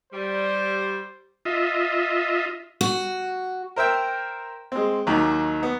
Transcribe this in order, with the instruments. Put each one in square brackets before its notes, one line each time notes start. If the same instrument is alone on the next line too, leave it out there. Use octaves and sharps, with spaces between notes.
[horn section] G3 [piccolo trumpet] C5
[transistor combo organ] F4 D#5 E5
[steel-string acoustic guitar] F#4
[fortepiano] A#4 C5 E5 G5
G#3 C4
D#2 D#3 F#3
B3